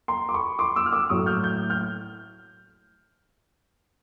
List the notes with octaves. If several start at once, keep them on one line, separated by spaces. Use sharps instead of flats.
A#5 C6
D6
B5 C#6
C6 D6
D6 E6
F6
D6 E6
A2 F#3 A3 C#6 D#6
F6 G6
G6
F6 G6